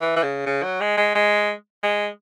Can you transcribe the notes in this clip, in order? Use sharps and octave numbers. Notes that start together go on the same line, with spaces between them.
E3
E3
C#3
C#3
F#3
G#3
G#3
G#3
G#3